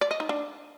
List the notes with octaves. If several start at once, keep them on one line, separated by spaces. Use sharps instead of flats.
D5
D#5
D#4
D4